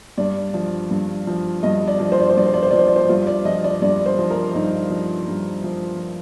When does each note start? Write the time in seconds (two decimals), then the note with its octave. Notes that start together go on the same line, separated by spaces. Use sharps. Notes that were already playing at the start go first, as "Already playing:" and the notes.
0.17 G2 D5
0.54 F3
0.91 G2
1.27 F3
1.63 G2 D#5
1.87 D5
2.00 F3
2.12 C5
2.20 D5
2.29 C5
2.37 G2 D5
2.46 C5
2.54 D5
2.63 C5
2.71 F3 D5
2.79 C5
2.88 D5
2.96 C5
3.09 G2 F4
3.27 D5
3.45 F3 D#5
3.64 D5
3.82 G2 D5
4.06 C5
4.19 F3
4.30 A#4
4.54 G2 D#4
4.90 F3
5.27 G2
5.64 F3